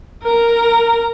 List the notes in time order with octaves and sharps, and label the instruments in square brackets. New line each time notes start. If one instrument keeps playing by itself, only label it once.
[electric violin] A#4 A#5